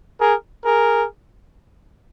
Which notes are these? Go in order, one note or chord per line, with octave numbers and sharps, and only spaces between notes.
G#4 A#4
G#4 A#4